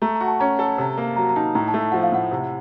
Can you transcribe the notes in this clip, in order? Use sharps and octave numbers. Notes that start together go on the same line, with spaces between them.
A3 A#5
A#5
F#4
A5
C#4 A#5
A4
C3
A#3
F#3 A#5
A#5
D#4 A5
A2 A#5
A5
A3
A5
F3 F#5
F5
A2 F#5
C3